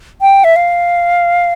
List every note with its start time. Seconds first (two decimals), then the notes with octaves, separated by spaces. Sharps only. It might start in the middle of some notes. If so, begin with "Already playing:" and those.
0.21 G5
0.44 E5
0.56 F5